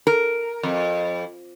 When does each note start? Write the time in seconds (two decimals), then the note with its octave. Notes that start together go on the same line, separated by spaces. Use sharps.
0.07 A#4
0.63 F2